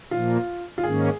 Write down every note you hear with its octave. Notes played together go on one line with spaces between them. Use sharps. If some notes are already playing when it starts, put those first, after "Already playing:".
A#2 F3 A#3 F4
F4
G#2 D#3 A#3 C#4 G#4